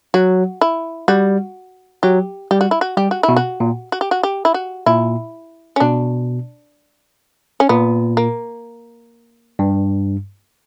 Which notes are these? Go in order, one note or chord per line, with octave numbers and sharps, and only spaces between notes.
F#3 F#4
E4
G3 F#4
F#3 G4
G3 G4
F#4
E4
F#4
G3 G4
F#4
E4
B2
F#4
A#2
F#4
G4
F#4
G4
E4
F#4
A#2 E4
C#4
B2 D4
C#4
A#2 B3
A#3
G2